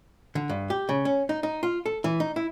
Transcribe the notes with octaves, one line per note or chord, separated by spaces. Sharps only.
D3
G2
G4
C#3
C#4
D#4
D#4
F4
A4
E3
D#4
E4